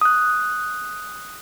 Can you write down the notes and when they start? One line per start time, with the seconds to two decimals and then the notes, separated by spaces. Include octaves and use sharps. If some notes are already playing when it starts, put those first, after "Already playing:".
0.01 D#6 F#6